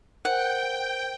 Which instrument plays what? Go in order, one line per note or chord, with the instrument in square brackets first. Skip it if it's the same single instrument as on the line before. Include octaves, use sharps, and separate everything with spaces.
[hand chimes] A#4 C5 [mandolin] F#5 [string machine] G5